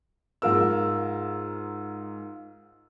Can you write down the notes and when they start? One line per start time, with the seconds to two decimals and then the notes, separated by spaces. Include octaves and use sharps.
0.42 G#2 F4 A#4 E6